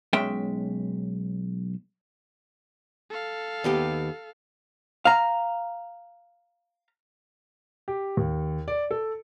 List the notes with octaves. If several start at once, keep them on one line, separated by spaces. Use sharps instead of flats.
B1 G#3 C#4 E5 G5 C6
A4 F5
D#2 B3 G4
F5 A#5
G4
D#2
D5
A4